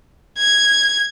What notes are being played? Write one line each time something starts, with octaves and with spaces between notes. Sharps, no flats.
G#6